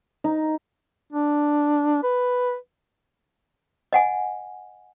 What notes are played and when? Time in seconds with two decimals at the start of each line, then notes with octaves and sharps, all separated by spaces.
0.24 D#4
1.13 D4
2.03 B4
3.93 D#5 F#5 G#5